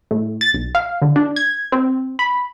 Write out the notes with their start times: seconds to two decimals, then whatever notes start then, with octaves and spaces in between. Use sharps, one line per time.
0.11 A2
0.41 A6
0.54 B1
0.75 F5
1.02 D3
1.16 D4
1.36 G#6
1.72 C4
2.19 B5